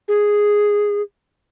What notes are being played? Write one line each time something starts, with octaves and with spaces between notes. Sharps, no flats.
G#4